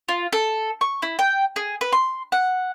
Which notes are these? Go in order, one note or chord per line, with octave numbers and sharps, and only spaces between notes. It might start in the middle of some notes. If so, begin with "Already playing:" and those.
F4
A4
C#6
E4
G5
G#4
B4
C6
F#5